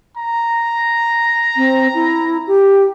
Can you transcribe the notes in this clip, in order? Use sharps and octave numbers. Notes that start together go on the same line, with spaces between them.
A#5
C4
E4
G4